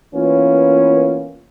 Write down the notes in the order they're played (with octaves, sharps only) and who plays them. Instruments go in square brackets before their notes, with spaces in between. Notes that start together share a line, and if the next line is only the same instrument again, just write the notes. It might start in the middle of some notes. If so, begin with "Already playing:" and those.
[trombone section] E3 A#3 B3 C#4 F4